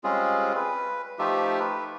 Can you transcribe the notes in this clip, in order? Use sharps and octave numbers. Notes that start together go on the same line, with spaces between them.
G3 G#3 C4 C#4 F4 G#4
B4
F3 A3 D#4 F4 G4 E5
B4